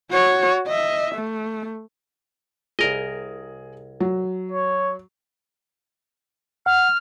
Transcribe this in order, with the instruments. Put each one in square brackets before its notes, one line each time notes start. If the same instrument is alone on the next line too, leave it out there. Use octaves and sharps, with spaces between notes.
[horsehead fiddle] F#4 C#5
D#5 E5
A3
[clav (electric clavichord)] C2 A#4 D#5 [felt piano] G#4
[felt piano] F#3
[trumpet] C#5
[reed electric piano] F#5 [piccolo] F6